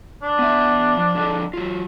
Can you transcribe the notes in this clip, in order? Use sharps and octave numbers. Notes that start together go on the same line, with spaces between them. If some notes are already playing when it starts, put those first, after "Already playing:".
D4
B3 E5
F3
D3 F3 A4
F#3 F4